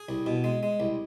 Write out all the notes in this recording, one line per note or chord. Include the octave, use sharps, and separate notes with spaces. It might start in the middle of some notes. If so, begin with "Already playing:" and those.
Already playing: G#4
C2
B2
G#3
G#3
C2